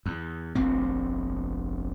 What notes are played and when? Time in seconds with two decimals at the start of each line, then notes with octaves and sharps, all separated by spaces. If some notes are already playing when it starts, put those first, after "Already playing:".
0.06 E2
0.55 F1 A#1 C4